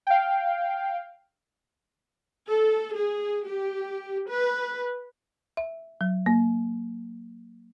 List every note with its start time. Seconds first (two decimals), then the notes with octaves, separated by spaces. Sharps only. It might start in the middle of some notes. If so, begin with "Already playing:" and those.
0.07 F5 G5
2.48 A4
2.96 G#4
3.48 G4
4.30 B4
5.57 E5
6.01 F#3
6.26 A#3